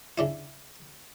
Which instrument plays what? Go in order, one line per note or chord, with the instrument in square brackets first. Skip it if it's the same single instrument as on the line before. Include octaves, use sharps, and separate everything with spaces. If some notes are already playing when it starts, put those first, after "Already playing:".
[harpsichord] C#3 D4 E4